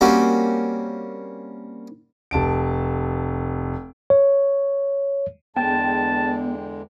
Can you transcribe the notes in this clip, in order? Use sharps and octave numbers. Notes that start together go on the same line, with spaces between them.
G3 A#3 C4 C#4 F#4
F1 A5 D7
C#5
E2 D3 G#3 B3 G5 A5